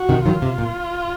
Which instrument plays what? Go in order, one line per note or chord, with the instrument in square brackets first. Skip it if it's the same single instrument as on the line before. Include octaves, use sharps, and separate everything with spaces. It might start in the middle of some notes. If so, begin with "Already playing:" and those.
Already playing: [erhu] F#4
[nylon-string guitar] C3 D#3
[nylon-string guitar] D#3 F#3 [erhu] F4
[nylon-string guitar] C3
A#2